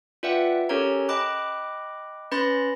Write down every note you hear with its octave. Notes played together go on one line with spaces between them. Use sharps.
F4 B4 D5 E5 F#5 G5
C#4 G4 A4 A#4 C#5 A#5
D#5 G5 B5 D6 F#6
C#4 B4 B5 C6 A6 A#6